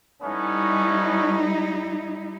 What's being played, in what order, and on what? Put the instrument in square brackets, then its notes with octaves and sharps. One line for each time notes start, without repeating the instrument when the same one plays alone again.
[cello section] G3 D#4 E4 [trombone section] A3 B3 C#4